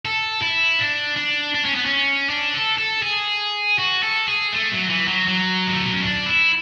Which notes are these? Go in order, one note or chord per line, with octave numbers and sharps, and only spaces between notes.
A4
E4
D4
D4
D4
C#4
B3
C#4
D4
A4
A4
G#4
F#4
A4
G#4
A3
F#3
E3
F#3
F#3
G#3
A3
B3
C#4
D4
E4